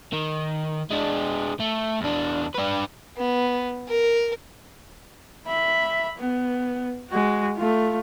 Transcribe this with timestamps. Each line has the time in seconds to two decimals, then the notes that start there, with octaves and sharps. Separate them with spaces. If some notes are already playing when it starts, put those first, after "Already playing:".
0.13 D#3
0.91 G#3 D4
1.60 A3
2.02 E2 D4
2.55 D4 B4
3.17 B3
3.88 A#4
5.47 E5 B5
6.18 B3
7.11 G#3 F#4
7.56 A3 F4